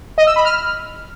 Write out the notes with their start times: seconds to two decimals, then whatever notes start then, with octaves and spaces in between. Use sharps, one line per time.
0.18 D#5
0.27 E6
0.36 B5
0.45 F6